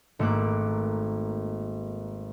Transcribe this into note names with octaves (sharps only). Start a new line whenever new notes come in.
G#1 A3 A#3 D6 F#6